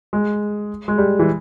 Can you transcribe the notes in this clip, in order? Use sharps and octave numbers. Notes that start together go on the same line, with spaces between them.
G#3
G#3
G3
E3